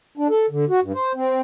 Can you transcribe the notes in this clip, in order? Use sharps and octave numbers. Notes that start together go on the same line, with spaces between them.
D4
A4
D3
F#4
G2
C5
C4